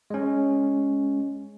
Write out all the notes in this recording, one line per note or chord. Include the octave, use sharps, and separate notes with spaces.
G#3 C#4